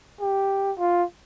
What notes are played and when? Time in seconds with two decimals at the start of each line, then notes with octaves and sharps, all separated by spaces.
0.20 G4
0.78 F4